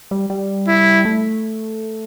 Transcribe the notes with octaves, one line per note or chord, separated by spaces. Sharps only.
G3
G3
E4
A3